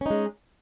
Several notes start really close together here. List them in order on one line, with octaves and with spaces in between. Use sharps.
C#4 D#4 G#3